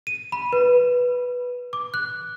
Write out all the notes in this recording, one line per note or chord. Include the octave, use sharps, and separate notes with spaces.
D#7
B5
B4
D6
F#6